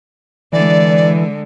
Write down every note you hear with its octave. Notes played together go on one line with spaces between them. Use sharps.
D3 E3 G#3 D5